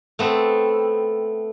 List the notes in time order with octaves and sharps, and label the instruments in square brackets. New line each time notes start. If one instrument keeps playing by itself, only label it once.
[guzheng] A3 B3 C4